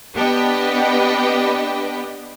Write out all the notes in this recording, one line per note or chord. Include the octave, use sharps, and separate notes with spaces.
B3 D4 G4 B4 D#5 G5